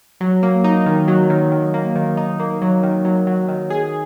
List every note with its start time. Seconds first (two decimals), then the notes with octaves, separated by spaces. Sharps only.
0.21 F#3
0.43 A#3
0.64 D#4
0.86 D#3
1.08 F#3
1.30 D#3
1.52 D#3
1.74 A#3
1.95 D#3
2.17 D#4
2.39 A#3
2.62 F#3
2.83 D#3
3.05 F#3
3.27 F#3
3.49 D#3
3.70 G#4